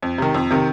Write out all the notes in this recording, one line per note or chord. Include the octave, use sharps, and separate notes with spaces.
F2
C3 D#3
F2
C3 D#3